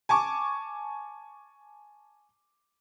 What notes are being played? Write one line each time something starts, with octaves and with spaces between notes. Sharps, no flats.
G#5 A5 C#6 D6